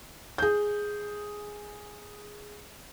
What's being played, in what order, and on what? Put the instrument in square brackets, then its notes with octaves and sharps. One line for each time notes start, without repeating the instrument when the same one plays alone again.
[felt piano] G#4 G6